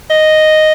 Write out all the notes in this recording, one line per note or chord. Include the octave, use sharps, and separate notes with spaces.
D#5